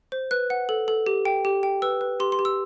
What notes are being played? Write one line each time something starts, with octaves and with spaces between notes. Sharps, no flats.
C5
B4 F#6
F#5
A4
A4
G4
G5
G4
G5
B4 E6
B4
G4 C6
C6
G4
E6